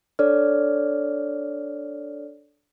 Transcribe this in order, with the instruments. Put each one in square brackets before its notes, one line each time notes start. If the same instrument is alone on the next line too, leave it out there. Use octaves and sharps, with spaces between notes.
[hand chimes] D4 A4 C#5 D5 F6